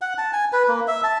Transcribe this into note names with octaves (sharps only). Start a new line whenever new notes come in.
F#5
A5
G#5
B4
A#3
E5
A5